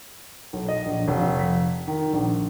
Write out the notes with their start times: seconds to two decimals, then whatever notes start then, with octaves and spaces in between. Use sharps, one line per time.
0.53 B1
0.68 D#5
0.86 A#1
1.08 F1
1.39 B6
1.88 D#3
2.13 A#1